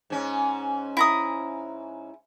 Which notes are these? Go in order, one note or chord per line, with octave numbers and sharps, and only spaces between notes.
G#2 C#4
E4 A#5 D#6